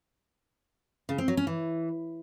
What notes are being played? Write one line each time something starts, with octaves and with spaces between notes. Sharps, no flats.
C#3
C4
F#3
C#4
E3